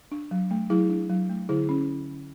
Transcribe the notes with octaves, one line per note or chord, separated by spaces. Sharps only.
D4
F#3
A3
F#3 E4 G#4
D4
F#3
A3
D3 E4 G#4
C#4